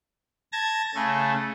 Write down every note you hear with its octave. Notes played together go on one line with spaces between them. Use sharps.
A5 G#6 A#6
C#3 A3